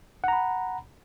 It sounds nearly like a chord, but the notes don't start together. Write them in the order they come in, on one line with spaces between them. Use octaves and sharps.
F#5 A#5 B5